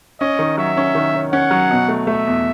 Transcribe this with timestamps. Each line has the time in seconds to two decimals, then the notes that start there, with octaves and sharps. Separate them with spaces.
0.20 C#4 D#5
0.39 D#3
0.57 F#3 E5
0.77 C#4
0.95 D#3
1.15 C#4
1.32 C#4 F#5
1.51 F#3
1.70 B2
1.88 A3
2.07 A3 E5
2.26 E2